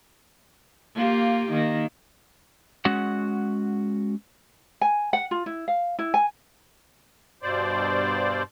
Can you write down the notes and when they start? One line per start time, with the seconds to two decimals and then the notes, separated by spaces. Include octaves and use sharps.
0.95 A#3 F4 G4
1.51 D#3 A#3
2.85 G#3 C#4 F#4 F#5
4.81 G#5
5.13 F#5
5.31 F4
5.46 E4
5.68 F5
5.99 E4
6.14 G#5
7.43 G2 B2 C5 D5